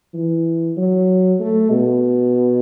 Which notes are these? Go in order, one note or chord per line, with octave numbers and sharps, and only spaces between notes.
E3
F#3
A3
B2